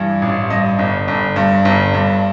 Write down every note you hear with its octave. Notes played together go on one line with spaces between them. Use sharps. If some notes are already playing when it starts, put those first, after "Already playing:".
Already playing: G2 E3
A1
G2 D#5
G1
G1
G2
G1
G2